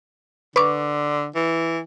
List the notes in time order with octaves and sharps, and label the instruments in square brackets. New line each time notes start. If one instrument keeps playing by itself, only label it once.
[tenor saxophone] D3 [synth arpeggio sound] B4 C#6 D6
[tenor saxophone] E3